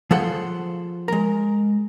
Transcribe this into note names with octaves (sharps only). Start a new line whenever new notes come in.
F3 G#4 A4 C5 F#5 C6
G#3 A#4